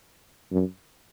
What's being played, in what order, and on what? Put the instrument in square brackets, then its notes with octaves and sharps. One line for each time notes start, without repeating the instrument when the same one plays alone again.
[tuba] F#2